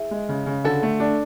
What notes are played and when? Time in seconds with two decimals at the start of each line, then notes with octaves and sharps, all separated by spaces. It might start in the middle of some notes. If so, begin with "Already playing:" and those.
Already playing: E4 G#4
0.11 G#3
0.29 C#3
0.46 C#3
0.64 D3 F#4 A4
0.83 A3
1.00 D4